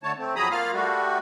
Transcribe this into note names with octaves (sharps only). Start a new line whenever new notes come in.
D3 A3 C#5 A5
A3 C4
F2 F#3 G#4 A#5 B5 D#6
A#3 F4 F5 F6
G3 A3 F#4